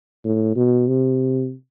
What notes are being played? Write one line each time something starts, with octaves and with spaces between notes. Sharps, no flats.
A2
B2
C3